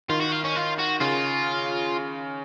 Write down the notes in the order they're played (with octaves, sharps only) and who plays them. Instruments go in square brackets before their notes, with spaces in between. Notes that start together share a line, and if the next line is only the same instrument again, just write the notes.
[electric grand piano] D#3 [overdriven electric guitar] F4
[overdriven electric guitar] F#4
F4
C#4
F4
F#4
[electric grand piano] C#3 [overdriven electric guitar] F4